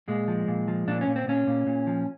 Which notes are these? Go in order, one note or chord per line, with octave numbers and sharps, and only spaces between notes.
A#2 G#3
F3
A#2
F3
A#2 D4
C#4
A#2
C4
A#2 C#4
A#2
A#2
F3